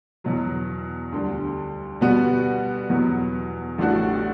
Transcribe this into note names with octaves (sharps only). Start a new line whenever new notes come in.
E2 B2 F#3
D2 D3 G3
B2 G3 B3 F#4
E2 B2 F#3 B3
A1 A2 G3 D4 F#4